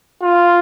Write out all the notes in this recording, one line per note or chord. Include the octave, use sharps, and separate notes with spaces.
F4